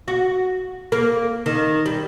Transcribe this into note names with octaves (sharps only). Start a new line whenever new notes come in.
F#4
A#3
D#3
G3